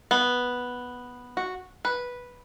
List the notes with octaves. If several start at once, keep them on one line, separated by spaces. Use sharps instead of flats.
B3
F#4
B4